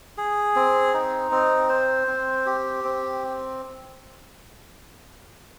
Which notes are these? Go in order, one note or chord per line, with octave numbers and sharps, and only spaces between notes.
G#4
C4
D#4
C4
C5
C4
G4
C4